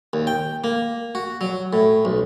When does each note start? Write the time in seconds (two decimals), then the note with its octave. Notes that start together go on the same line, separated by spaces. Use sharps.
0.13 D#2
0.27 G5
0.64 A#3
1.15 F#4
1.41 F#3
1.73 A2
2.05 B1